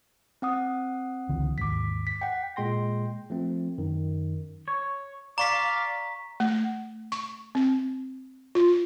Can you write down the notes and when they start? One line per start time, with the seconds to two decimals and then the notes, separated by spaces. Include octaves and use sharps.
0.42 C4 F#5 D#6
1.29 C#2 D3 E3
1.58 D#2 G#2 D6 B6
2.07 B6
2.21 F#5 G5
2.56 A#2 G#3 G5 C6 A#6
3.30 F3 A3 C4
3.78 F#2 D#3
4.68 C#5
5.38 D5 F5 A#5 C#6 B6
6.40 A3
7.12 C#6
7.55 C4
8.55 F4